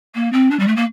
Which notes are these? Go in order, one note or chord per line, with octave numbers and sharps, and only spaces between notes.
A#3
C4
D4
G3
A3
A#3